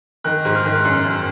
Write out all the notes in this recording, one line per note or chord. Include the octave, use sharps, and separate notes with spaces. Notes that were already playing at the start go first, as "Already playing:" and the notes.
D#3 F#6
G#2
F6
D#3
F#2
F#2